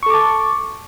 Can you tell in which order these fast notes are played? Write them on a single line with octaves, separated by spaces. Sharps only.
C#6 A4 D6 A5